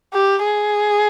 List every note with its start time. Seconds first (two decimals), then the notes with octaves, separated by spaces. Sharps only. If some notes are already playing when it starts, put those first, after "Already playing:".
0.13 G4
0.44 G#4